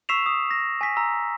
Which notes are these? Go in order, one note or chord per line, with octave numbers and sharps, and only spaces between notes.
C#6 E6 B6 C7 E7 F7
D#6
A#6
G#5 B6
A#5 E6